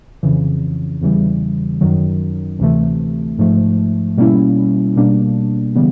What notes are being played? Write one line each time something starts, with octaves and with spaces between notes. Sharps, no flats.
F2 C#3 E3
E2 C#3 E3 G3
F#2 D#3 F#3
D2 C3 E3 A3
G#2 F3 A3
B2 G3 A#3 C#4 E4
B2 G3 A#3 D4
C#3 E3 G3 B3